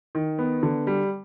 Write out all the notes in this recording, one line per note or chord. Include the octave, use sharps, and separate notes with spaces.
D#3
B3
D3
G3